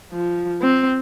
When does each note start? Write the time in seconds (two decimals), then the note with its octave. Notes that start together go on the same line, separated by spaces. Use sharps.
0.12 F3
0.61 C4